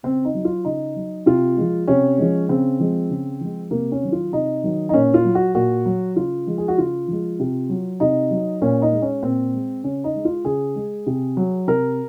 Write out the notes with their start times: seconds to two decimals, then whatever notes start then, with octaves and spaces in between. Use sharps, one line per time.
0.03 C#3 C4
0.25 D#4
0.35 F#3
0.45 F4
0.65 C#3 D#4
0.96 F#3
1.26 C3 F4
1.57 F3 G#3
1.88 C3 C#4
2.18 F3 G#3
2.49 C#3 C4
2.80 F3 G#3
3.10 C#3
3.40 F3 G#3
3.71 C3 A#3
3.92 C#4
4.02 D#3 F#3
4.12 F4
4.33 C3 D#4
4.64 D#3 F#3
4.89 D#4
4.93 A#2 C#4
5.14 F4
5.25 F#3
5.35 F#4
5.55 A#2 F#4
5.86 F#3
6.16 C#3 F4
6.47 F3 G#3
6.58 G#4
6.68 F#4
6.78 C#3 F4
7.08 F3 G#3
7.40 C3
7.70 F#3
8.00 C3 D#4
8.31 F#3
8.62 A#2 C#4
8.82 D#4
8.92 G#3
9.02 C#4
9.23 A#2 C4
9.53 G#3
9.83 C#3 C#4
10.04 D#4
10.15 G#3
10.25 F4
10.45 C#3 G#4
10.75 G#3
11.07 C3
11.37 F#3
11.68 C3 A#4